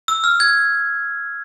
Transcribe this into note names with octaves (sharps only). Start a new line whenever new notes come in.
E6
F6
G#6